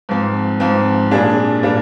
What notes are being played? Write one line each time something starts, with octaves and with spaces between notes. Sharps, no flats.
G#2 F3 C4
G#2 F3 C4
A#2 G3 D4 G#4
A#2 G3 D4